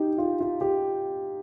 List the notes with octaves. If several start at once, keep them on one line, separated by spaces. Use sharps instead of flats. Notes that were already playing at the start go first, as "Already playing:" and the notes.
Already playing: D#4 G4
F4
F4
G4